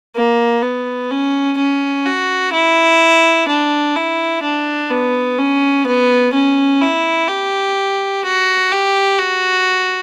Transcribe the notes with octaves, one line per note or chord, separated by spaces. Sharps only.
A#3
B3
C#4
C#4
F#4
E4
D4
E4
D4
B3
C#4
B3
C#4
E4
G4
F#4
G4
F#4